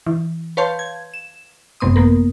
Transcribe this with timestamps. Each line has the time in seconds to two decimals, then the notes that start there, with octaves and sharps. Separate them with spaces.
0.07 E3
0.57 B4 C#5 F5 A5 C6 G6
0.79 G#6
1.14 E7
1.80 G#1 F#2 C3 B3 C6 D#6
1.96 A#3 B3 A#4